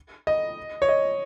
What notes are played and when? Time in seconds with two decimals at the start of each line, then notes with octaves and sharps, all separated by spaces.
0.27 D#5
0.82 C#5
0.89 D#5